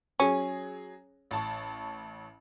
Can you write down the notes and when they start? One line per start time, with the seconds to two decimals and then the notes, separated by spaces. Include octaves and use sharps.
0.20 F#3 C#4 G#4
1.31 A1 A5 C#6